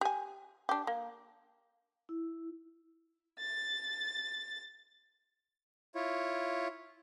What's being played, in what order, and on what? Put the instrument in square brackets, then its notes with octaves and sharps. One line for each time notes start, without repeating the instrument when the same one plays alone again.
[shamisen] G4 G#5
D4 G4
A#3
[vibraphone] E4
[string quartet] A6
[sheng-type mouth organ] E4 F4 C#5